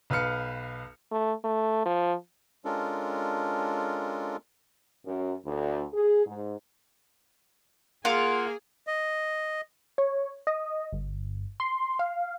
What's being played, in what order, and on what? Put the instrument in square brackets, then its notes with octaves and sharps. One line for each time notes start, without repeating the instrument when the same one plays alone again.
[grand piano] B1 B4 F5 F6 C#7
[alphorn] A3
A3
F3
[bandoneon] G#3 C#4 D4 F4 A4 A#4
[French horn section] F#2
D2
G#4
G#2
[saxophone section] A#3 [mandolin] F4 F5 F#5 [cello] G#4
[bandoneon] D#5
[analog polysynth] C#5
D#5
G1
C6
F5